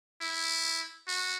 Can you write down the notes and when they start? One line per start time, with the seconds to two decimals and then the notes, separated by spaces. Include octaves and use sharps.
0.21 E4
1.08 F#4